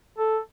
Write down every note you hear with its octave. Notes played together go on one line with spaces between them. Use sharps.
A4